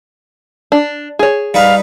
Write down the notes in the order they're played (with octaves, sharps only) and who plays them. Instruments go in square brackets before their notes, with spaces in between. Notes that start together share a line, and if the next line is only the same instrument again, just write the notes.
[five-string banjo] D4
G#4 C#5
[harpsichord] G3 D#4 B4 [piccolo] F5